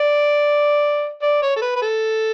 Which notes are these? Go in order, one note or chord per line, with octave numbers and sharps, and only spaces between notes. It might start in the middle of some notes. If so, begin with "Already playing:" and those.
Already playing: D5
D5
C#5
A4
B4
B4
A4